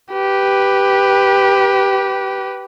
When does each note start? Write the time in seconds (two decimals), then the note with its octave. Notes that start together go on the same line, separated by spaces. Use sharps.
0.13 G4 B4